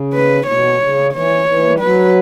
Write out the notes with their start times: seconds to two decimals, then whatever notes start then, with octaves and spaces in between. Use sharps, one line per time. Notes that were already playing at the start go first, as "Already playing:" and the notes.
Already playing: C#3
0.14 B4
0.47 B2 C#5
0.80 C#3
1.13 E3 C#5
1.46 E3
1.63 A#3
1.71 G3
1.80 F#3 B4